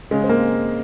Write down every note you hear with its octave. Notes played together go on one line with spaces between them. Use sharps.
C#3 G#3
C4
A#3